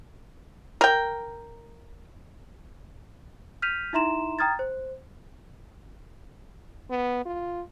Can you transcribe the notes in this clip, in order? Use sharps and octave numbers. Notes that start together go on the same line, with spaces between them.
A#4 G5
F6 G6 B6 D#7 F7
D#4 E4 E5 A#5 C6 E7
G5 A#5 D#6 F6 G#6 A6
C5
B3
F4